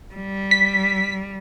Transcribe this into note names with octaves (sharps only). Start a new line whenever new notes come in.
G3
B6